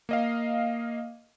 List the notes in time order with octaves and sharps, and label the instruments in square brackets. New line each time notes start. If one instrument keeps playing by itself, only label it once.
[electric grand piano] A#3 D#5 F5